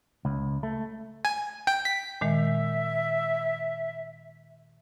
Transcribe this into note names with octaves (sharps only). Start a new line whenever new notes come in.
C#2
A3
G#5
G5
B6
A#2 D#3 G#3 E5